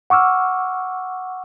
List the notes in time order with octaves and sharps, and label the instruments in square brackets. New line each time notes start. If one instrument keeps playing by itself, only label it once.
[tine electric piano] F#5 C#6 D6 E6 F6